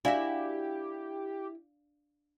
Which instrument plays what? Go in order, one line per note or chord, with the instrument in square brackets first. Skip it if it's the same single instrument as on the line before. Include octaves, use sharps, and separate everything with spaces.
[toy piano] D4 D5 F5 [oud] E4 F#4 E5 [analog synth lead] G4